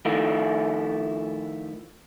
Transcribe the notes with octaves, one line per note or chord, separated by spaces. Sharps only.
D#3 F3 A3 E4 F4